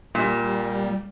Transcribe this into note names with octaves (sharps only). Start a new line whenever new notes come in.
A#2 G3